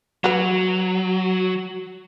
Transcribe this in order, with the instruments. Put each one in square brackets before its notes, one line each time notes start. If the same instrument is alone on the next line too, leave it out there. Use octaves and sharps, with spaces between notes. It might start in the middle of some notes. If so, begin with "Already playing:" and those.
[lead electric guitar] F#3 [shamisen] F#4 B4